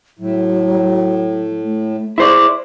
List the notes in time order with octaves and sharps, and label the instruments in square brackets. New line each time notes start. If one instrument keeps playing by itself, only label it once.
[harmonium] A2 [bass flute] F#3
[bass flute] A3
[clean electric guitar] E4 C5 D5 [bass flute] G#4